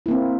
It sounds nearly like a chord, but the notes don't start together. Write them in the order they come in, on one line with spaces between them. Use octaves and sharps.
E4 A#3 C4